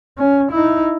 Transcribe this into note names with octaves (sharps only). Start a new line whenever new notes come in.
C#4
D#4 E4